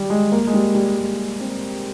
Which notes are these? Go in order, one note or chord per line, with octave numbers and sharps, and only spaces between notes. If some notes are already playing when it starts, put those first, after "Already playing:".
Already playing: D#3 G3
G#3
A#3
G#3
G3
G3
G#3
C4